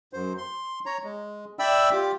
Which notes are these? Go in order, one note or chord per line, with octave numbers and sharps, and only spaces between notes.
F#2 C5
C6
C#5 A#5
G#3
D5 E5 G5 B5 E6
F4 G4 D6